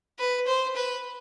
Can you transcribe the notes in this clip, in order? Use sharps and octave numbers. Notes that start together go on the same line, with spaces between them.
B4
C5
B4